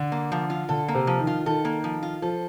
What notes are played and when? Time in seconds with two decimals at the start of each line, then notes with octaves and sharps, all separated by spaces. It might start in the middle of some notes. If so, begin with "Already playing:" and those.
Already playing: D3
0.12 A#3
0.32 F3
0.50 F4
0.69 D3 A4
0.88 A#3
0.95 C3
1.07 F3
1.20 D#3
1.27 F4
1.46 D#3 A4
1.65 A#3
1.84 F3
2.03 F4
2.22 F3 A4